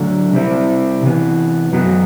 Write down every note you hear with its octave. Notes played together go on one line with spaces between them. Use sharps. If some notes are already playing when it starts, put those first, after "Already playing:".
Already playing: D3 F#3 A3 D4
C3 G3 C4 E4
C3 E3 B3
F#2 F#3 B3 F#4